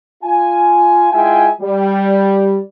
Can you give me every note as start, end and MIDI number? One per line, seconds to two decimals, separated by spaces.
0.23 1.08 65
0.23 1.08 80
1.12 1.49 56
1.12 1.49 64
1.12 1.49 65
1.12 1.49 76
1.12 1.49 79
1.12 1.49 80
1.62 2.58 55